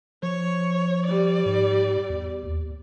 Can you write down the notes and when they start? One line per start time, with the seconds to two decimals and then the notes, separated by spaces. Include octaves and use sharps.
0.23 F3 C#5
1.06 G3 D5
1.46 G#2
2.10 E2
2.45 D#2